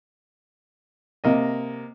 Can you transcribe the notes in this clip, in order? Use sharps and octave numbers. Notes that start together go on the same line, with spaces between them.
C3 A#3 D#5